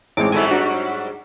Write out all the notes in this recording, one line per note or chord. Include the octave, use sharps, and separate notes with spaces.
A1 G#3 C4 C#5 D6
G#2 F#3 G3 E4 A4 G#5
D4 F#4